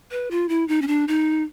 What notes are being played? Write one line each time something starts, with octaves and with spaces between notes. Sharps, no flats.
B4
F4
E4
D#4
C#4
D4
D#4